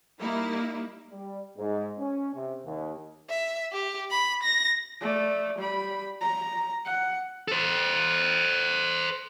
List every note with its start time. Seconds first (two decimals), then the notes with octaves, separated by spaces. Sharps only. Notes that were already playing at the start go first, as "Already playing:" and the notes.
0.20 G3 A#3 D#4 E4
1.11 G3
1.58 G#2
2.00 C#4
2.35 C3
2.65 D#2
3.30 E5
3.73 G4
4.11 B5
4.43 A#6
5.01 A3 D5
5.58 G3 B5
6.21 A#5
6.85 F#5
7.48 A4 C5